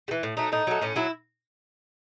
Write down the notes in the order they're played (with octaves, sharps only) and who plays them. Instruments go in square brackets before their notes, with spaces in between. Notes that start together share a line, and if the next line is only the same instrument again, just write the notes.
[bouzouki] G3
E3
A2
F#3 A3 D#4
A2 D#4
F#3 A3
A2 C#4
F#3 E4